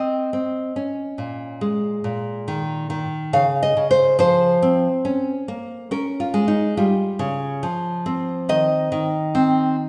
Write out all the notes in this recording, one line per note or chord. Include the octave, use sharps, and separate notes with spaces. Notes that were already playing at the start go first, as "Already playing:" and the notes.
Already playing: C4 D#5
C4
C#4
A#2
G#3
A#2
D#3
D#3
C#3 F5
D#5
C#3
C5
F3 C5
C4
C#4
A#3
C#4 A#4
F4
G#3
D#4
G3 F4
C#3
F3
C4
D#3 D#5
D#3
C4